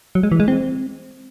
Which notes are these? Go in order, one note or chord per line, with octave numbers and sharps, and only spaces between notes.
F#3
G#3
E3
G#3
C4